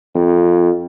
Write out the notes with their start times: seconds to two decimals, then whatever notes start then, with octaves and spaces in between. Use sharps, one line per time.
0.15 F2